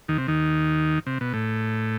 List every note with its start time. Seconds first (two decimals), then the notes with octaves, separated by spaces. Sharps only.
0.08 D#2 D#3
0.18 C3
0.28 D#2 D#3
1.07 C3
1.21 B2
1.34 A2